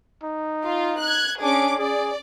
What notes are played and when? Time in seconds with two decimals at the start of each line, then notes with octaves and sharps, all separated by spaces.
0.24 D#4
0.64 F4
1.01 F#6 G#6
1.41 C#4 D4 G#4 D6
1.79 G#4 D5